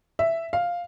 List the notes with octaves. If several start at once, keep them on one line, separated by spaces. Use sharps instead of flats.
E5
F5